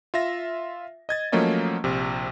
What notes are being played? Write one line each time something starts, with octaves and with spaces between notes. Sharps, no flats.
F4 E5 A#6
D#5 G#6 A6
F3 F#3 A3 A#3 C#4 D#5
A#1 C3